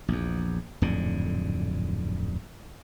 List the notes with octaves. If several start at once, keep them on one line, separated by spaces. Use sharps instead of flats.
A#1 E2
D1 F2 G#2 D3